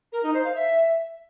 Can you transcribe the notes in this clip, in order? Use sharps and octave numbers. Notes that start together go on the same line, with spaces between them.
A#4
D#4
C5
F5
E5